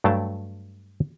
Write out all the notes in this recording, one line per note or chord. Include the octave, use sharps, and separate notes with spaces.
G2 F#3 A3 F5 G5 A5